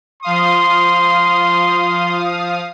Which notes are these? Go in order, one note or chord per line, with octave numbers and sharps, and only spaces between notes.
F3 F5 C6 D#6